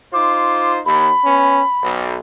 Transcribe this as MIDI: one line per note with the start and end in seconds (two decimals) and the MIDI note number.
0.14 0.80 63
0.14 0.80 65
0.14 0.80 72
0.14 0.72 86
0.86 1.10 39
0.86 1.91 83
1.25 1.61 59
1.25 1.61 61
1.83 2.19 35